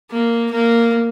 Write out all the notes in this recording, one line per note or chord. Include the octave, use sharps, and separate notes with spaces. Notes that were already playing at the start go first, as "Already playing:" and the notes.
A#3
A#3